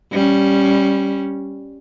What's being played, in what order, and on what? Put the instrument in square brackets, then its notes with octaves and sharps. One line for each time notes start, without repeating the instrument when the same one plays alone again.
[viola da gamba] G3 C#4